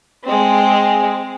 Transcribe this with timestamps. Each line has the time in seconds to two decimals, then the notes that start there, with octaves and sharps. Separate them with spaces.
0.24 G#3 C4